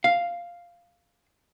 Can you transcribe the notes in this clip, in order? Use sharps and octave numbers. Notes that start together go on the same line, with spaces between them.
F5